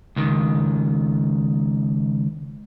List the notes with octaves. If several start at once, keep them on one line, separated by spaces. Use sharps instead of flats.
C#2 D#3